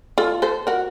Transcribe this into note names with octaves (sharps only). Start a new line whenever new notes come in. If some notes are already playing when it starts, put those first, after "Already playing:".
F4 A4
A4 C5
F#4 A#4